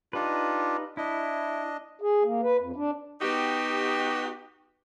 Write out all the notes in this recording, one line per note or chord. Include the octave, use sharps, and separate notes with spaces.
D4 D#4 F4 G4 B4
D4 E4 D#5
G#4
A#3
B4
F2
D4
B3 D#4 F#4 G4